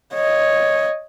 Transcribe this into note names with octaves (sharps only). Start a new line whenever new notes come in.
C#5 D#5